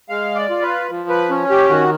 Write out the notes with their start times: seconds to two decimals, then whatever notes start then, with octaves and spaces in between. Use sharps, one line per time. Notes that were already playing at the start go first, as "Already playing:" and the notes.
0.09 G#3 F5
0.35 D5
0.50 F4
0.62 B4
0.90 F3
1.09 B4
1.30 C#4
1.50 G4
1.69 D#3 F#4